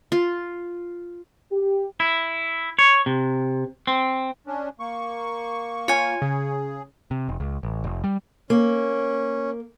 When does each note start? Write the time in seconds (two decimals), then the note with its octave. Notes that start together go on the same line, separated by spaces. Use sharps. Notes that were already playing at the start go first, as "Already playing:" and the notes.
0.12 F4
1.53 G4
2.00 E4
2.79 C#5
3.06 C3
3.87 C4
4.47 C#4 D4
4.80 A#3 C#6
5.88 F4 C#5 G#5
6.22 C#3 G#4
7.11 C3
7.29 F1
7.40 C#2
7.63 A1
7.84 F1
8.04 G3
8.50 A#3 C#4